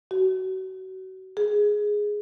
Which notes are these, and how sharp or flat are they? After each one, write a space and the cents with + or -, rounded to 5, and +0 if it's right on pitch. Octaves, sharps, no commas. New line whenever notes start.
F#4 +30
G#4 +0